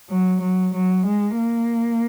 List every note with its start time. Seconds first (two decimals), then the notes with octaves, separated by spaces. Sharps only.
0.11 F#3
0.42 F#3
0.75 F#3
1.07 G#3
1.39 A#3